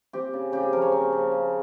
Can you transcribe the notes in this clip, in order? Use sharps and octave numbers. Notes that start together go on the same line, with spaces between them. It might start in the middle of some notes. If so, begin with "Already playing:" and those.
C4 G4
C#3
C#3 G4
G#4
F3 A#4
C#5
C4
C#3
C#3